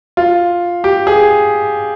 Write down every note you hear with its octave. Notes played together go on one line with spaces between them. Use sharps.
F4
G4
G#4